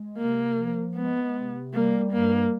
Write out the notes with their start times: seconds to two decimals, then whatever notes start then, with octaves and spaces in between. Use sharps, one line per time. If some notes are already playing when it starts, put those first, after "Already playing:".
Already playing: G#3
0.18 C3 A#3
0.57 F3
0.96 G#3 B3
1.35 C3
1.74 G3 A#3
2.12 G2 A#3